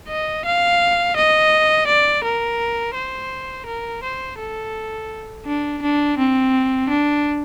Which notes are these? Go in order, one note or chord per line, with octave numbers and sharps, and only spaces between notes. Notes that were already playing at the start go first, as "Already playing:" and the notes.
D#5
F5
D#5
D5
A#4
C5
A#4
C5
A4
D4
D4
C4
D4